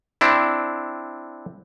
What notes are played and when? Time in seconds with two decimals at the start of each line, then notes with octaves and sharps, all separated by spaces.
0.21 C4 D4 E4